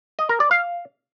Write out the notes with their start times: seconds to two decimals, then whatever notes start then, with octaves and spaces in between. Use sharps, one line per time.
0.19 D#5
0.29 A#4
0.40 D5
0.51 F5